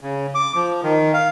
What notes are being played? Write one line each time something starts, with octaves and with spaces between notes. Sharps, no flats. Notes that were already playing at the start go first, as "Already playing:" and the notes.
C#3
D6
F3
D#3
F5